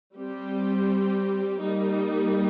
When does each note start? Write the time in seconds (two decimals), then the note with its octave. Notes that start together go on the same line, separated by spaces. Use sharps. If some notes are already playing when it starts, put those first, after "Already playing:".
0.15 G3 C4 G4
1.59 G3 A#3 D#4